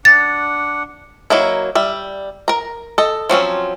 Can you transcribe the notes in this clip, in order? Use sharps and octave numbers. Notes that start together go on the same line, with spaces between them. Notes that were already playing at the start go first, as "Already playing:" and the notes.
D4 F#5 A6
F#3 A#3 D#4 E4
G3 E5
A#4 A#5
A4 D#5
F3 F#3 C4 C#4